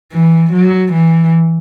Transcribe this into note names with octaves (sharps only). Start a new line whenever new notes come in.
E3
F#3
E3